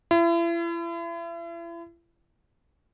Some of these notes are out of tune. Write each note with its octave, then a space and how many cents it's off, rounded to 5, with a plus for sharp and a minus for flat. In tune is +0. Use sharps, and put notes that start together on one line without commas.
E4 +40